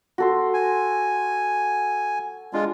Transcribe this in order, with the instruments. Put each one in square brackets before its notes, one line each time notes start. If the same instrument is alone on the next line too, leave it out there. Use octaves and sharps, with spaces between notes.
[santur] F#4 A4 C6
[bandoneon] G#5
[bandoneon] G#3 F4 [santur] D4